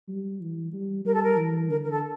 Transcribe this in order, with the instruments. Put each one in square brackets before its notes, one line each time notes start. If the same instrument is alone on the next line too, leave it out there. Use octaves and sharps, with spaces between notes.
[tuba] G3
E3
G3
[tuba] G3 [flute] A#4
[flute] A4
A#4
[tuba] E3
[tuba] D3 [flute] A#4
[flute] A#4
A4